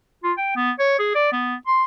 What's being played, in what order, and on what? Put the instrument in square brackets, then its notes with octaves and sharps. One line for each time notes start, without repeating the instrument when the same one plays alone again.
[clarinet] F4
G5
B3
C#5
G#4
D5
B3
C6